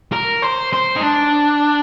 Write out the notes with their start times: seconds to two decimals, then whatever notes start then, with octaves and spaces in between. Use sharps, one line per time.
0.12 A#4
0.42 C5
0.73 C5
0.96 D#4
1.02 D4